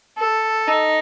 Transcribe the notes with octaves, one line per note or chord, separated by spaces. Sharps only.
A4
D#4